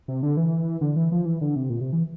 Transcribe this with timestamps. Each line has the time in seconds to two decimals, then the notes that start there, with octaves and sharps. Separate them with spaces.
0.08 C3
0.23 D3
0.37 E3
0.81 D3
0.96 E3
1.12 F3
1.25 E3
1.41 D3
1.56 C3
1.70 A#2
1.81 C3
1.93 E3